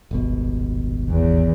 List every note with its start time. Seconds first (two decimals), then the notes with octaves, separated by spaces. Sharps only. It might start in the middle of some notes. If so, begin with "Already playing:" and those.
0.11 D#1 G#1 B2
1.09 E2